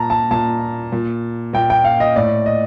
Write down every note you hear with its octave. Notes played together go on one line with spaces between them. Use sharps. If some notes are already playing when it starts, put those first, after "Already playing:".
Already playing: A#2 A5 A#5
A5
A#2 A5
A#2
A#2 G5
G5
F5
D#5
A2 D5
D#5